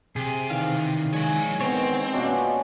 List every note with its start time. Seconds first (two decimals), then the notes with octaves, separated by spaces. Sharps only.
0.16 C3 G#4
0.50 D#3 E3 D5 F5
1.14 F3 G#3 C#5
1.61 D#3 B3 C4 C#5 A#5
2.13 B2 A#3 C#4 D4 F4 D#5